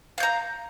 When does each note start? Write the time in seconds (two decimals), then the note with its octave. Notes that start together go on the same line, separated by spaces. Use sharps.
0.18 F5
0.20 G6
0.23 A#5